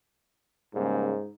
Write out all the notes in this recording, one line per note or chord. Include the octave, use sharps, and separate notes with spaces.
G#2 C#3 G3 A#3